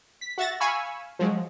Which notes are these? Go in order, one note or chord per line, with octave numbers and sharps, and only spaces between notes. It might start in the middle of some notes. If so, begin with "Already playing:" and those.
B6
F#4 E5 A6 A#6
F5 G#5 B5 C#6 E6
F3 F#3 G#3